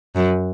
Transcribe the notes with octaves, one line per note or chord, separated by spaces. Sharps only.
F#2